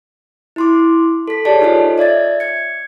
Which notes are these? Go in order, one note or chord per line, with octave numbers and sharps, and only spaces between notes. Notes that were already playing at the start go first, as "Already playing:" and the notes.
E4 C6 D6
A4 B6
G4 G#4 C#5 D5 A5
D#4 F4 A4 C5 C#5 D#5
D5 E5 G#6 A6
G#6 C#7